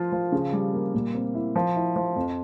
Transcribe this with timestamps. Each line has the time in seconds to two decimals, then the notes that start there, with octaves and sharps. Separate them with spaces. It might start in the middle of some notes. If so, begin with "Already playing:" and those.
Already playing: F3 F4
0.12 F3
0.32 C#3
0.53 G3
0.73 A#3
0.94 A#2
1.15 C4
1.35 E4
1.56 F3
1.76 E4
1.96 F3
2.16 F2